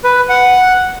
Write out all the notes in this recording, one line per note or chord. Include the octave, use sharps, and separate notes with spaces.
B4
F#5